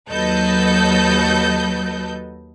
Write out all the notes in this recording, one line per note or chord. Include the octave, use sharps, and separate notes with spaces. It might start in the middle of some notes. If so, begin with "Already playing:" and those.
D#2 F#3 A4 B4 D#5 G6